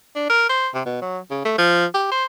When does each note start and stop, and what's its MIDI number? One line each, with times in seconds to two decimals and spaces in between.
0.15 0.28 62
0.30 0.48 70
0.49 0.68 72
0.74 0.82 48
0.85 1.01 47
1.01 1.19 54
1.30 1.44 49
1.45 1.55 57
1.58 1.85 53
1.94 2.07 67
2.11 2.25 72